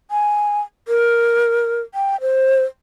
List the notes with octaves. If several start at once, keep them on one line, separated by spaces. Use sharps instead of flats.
G#5
A#4
G5
C5